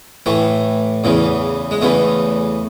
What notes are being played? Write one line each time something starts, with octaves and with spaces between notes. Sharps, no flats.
A2 E3 A3
E2 C#3 E3
G#3
E2 C#3 E3 A3